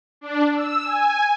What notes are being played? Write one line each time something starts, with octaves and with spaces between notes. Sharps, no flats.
D4
E6
G#5